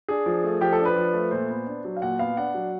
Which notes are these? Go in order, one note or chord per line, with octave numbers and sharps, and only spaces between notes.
D4 G#4
F3
A3
F3 G4
A4
D4
B4
F3
A3
A#2 C5
B3
D4
F#3
F5
A#2 F#5
B3 F5
D4 F#5
F#3